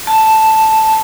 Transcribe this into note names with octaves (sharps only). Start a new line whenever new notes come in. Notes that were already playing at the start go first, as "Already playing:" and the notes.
A5